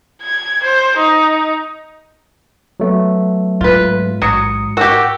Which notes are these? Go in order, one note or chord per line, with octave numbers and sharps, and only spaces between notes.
G#6
C5
D#4
F#3 A3 B3
G#2 F4 B4
A1 F#3 D#6 C#7
F#4 G4 A#4 F#5 E6